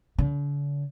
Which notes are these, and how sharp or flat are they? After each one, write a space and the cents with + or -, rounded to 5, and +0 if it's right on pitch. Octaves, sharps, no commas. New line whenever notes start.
D3 -45